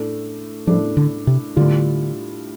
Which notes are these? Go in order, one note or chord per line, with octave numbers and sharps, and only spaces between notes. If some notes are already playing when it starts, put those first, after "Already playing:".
Already playing: A2 A3 D4
A2 F3 A3 D4
D3
C3
A2 D3 G3 D4 F4